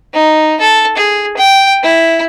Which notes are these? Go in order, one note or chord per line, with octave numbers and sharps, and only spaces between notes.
D#4
A4
G#4
G5
E4